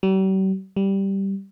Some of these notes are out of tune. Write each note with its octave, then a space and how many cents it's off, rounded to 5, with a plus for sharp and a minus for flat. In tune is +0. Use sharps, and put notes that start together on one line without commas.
G3 -45
G3 -5